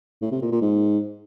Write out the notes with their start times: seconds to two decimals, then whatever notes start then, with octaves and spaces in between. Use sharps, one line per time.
0.21 A2
0.32 C3
0.42 A#2
0.52 A#2
0.62 G#2